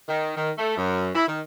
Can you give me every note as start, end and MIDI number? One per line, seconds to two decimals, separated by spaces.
0.08 0.32 51
0.36 0.51 51
0.58 0.75 57
0.77 1.09 42
1.15 1.25 64
1.28 1.40 51